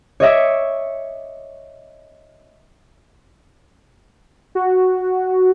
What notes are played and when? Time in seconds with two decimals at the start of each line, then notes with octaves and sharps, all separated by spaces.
0.20 C#5 D#5 E5 D6
4.55 F#4